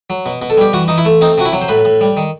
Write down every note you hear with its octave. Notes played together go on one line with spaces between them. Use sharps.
F#3
B2
B2
A4
G3 G4
E3 F#4
E3 D#4
E4
A3
C4 D#4
C3 F#4
E4
F#3
C5
A2 B4
A2
G3
D#3